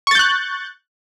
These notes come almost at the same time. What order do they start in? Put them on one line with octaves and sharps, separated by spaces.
C#6 A6 G6 F#6